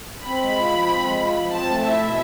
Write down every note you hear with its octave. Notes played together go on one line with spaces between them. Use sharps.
C4 B5
G#3
F4
F3
C4
G#3
F4
F3
C4 A5
A3
E4 E5
B2